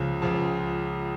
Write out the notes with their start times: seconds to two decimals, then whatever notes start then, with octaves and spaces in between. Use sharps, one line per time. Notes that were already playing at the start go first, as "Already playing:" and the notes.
Already playing: C#2 C#3 F3
0.22 C#2 C#3 F3